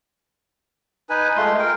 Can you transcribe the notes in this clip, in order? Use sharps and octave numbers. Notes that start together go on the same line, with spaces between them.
D#4 B4 G#5
G#3 A3 F4 C6
A#4 G5